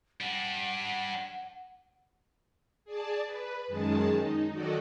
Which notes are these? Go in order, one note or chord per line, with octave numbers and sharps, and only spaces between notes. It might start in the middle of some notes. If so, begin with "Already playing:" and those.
G3 D4 F#5
G#4 D5 A5
B4
F#2 D#3 G#3 G#4 A5
D#4
D#3 F#3 F#4 A4 D5 D#5